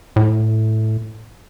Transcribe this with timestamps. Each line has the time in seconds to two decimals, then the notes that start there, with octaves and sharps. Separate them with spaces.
0.16 A2